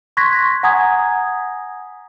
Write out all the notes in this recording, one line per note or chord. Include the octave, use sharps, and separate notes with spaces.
C6 C#6 F#6 G#6 A#6 B6
F#5 G#5 A#5 D#6 G#6